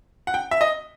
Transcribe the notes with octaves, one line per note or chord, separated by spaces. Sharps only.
F#5
G5
E5
D#5